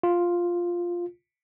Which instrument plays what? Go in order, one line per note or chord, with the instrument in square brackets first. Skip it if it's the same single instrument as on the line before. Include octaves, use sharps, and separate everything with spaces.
[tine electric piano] F4